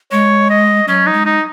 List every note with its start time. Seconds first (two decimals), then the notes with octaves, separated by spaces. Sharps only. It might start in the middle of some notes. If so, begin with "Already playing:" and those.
0.12 G#3 C#5
0.50 D#5
0.88 F#3 C#4
1.06 D#4
1.13 G#3
1.25 D#4